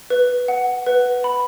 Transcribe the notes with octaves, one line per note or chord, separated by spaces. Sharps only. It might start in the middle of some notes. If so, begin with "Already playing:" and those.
B4
F#5
B4
B5